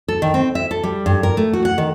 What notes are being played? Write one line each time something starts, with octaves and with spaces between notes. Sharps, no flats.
A4
D#3
C4
E5
A4
G3
G2
A#4
A3
F#4
F#5
D#3